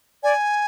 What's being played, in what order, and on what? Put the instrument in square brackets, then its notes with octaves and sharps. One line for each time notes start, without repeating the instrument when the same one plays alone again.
[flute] D5 [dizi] G#5